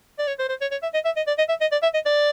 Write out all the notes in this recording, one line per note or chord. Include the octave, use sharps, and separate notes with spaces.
D5
C#5
C5
C5
C#5
C#5
E5
D#5
E5
D#5
D5
D#5
E5
D#5
D5
E5
D#5
D5